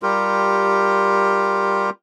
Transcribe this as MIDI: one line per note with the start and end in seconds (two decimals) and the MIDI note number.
0.03 1.90 55
0.03 1.90 65
0.03 1.90 67
0.03 1.90 70